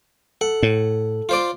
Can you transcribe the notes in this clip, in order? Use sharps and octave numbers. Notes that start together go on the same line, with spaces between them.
A4 F#5
A2
F4 C5 D5